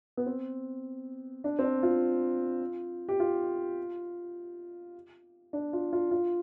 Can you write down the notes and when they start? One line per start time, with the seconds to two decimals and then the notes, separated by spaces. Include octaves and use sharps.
0.17 B3
0.26 C4
1.44 D4
1.59 C4
1.63 D4
1.83 F4
3.09 G4
3.20 F4
5.53 D4
5.73 F4
5.93 F4
6.11 F4